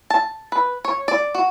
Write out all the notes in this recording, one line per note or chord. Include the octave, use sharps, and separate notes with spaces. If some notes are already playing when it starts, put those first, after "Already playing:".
A5
B4
C#5
D5
F#4